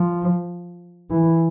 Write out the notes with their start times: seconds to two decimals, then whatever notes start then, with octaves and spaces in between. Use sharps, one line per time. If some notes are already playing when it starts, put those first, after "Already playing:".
Already playing: F3
1.10 E3